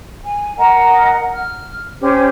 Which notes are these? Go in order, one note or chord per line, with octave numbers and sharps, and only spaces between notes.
G#5
A#4 D#5 F#5 A#5
F6
C#4 G4 C5